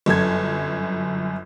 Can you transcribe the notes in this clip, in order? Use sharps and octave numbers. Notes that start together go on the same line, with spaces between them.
G1 F#2 A4 G#6